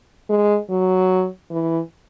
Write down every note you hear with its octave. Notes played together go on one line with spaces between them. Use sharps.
G#3
F#3
E3